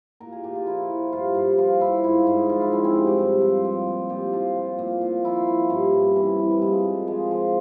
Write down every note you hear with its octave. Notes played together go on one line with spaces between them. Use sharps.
A#2 A#4
G#4
A#2 G4
F4
F3 E4
F3
G2 F4
G2
F3 F4
F3 E4
G#2 E4
G#2
F3 F4
E4
F3 C#4
C4
G2 G4
G4
G2 E5
F3 C5
F3
A#2
A#2 G4
F3 F4
F3
A#2
A#2
F3 E4
F3
G2 C#4
G2
E3 C4
E3
G3
A#2 G#3
A#2
F3 G#3
F3